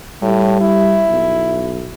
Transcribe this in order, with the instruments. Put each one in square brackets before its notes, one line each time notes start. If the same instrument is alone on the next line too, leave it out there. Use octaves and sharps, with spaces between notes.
[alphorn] A2 [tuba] G3
[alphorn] E4
[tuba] B1